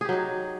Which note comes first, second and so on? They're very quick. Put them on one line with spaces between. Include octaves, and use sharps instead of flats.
G#4 G4 F#3 D#4